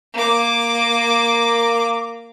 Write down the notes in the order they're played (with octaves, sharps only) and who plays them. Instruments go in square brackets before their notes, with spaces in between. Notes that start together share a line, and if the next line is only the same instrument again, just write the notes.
[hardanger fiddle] A#3 D6